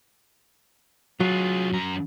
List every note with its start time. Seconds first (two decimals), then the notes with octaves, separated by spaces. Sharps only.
1.20 F#3 F4 G#4
1.73 F#2 A#5